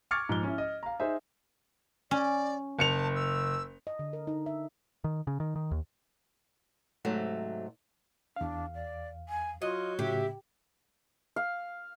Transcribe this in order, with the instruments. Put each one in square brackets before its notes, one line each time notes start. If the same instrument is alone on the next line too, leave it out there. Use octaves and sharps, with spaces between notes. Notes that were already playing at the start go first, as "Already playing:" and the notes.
[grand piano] C#6 D6 F6 G#6 A6 C#7
G#2 F3 G7
C#4 E4
D#5
F5 A#5
D#4 G#4 C5 E5
[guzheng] C#4 [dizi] D5
[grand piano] F#1 C#7 F7 [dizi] A5
[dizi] E6
[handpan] D#5
D3
A#4
D#4
E5
[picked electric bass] D#3
C#3
D#3
D#3
D#2
[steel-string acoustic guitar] G#2 C3 F#3 A3
[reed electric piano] E2 F5 [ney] D4
[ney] D5
G#5
[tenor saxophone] F#3 [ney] F4 [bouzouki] D#5
[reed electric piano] A2 C#3 [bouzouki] G4 [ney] E5
[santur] F5